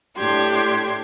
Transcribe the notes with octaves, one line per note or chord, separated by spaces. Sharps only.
A2 D4 G4 C6 G#6